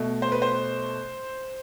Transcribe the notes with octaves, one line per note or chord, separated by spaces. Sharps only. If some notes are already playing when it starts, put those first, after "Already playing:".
Already playing: B2 A3
C5
B4
C5